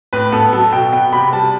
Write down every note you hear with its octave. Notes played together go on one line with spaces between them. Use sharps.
A2 B4
B3 A4
F#3 A4
B2 G5
B3 G5
C3 B5
G3 A5